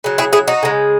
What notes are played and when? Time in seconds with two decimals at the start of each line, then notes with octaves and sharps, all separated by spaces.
0.04 C#3 F#3
0.18 E4 G#4
0.33 E4 G#4
0.48 D#4 F#4
0.63 C#3 G#3